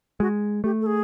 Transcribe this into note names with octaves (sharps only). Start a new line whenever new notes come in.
G#3 F#4
A3 G4
A4
G#4